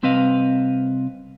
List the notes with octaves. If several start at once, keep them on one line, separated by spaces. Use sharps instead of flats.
C2 C4 B4 D#5 F5